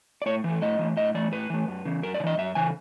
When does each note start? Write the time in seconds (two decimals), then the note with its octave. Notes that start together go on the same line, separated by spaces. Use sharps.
0.22 D5
0.26 A2 C#5
0.44 E3 A3
0.62 A2 D#5
0.79 E3 A3
0.97 A2 D#5
1.14 E3 A3 D5
1.32 A2 B4
1.50 E3 A3
1.68 F#2
1.85 C#3 E3
2.03 F#2 A#4
2.14 D5
2.20 C#3
2.24 E3 D#5
2.38 F#2 E5
2.55 C#3 E3 G#5